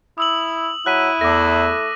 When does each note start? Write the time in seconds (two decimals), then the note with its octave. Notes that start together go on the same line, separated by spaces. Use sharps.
0.18 E4 D#6 E6 F#7
0.86 F#3 E4 F#6 B6 D#7
1.21 E2 A3 D6 A#6